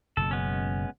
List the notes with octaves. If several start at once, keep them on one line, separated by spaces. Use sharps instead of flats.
F#1 B2 A4
G#3 B3 C#4